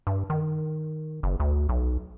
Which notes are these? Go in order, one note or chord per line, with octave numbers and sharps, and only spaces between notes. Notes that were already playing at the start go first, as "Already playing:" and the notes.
G2
D#3
F#1
D2
B1